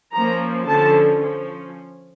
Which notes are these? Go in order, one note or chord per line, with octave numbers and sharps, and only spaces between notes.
F3 A#3 C#4 A#5
D3 F3 C#4 A5
F3 C#4